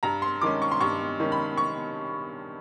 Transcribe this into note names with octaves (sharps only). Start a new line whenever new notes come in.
G2 A#5
C6
D#3 G#3 C#4 D6
C#6
C6
G2 C#6
D#3 G#3 C#4
B5
C#6